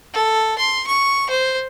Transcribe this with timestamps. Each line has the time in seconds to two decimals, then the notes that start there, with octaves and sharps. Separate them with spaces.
0.14 A4
0.58 C6
0.87 C#6
1.30 C5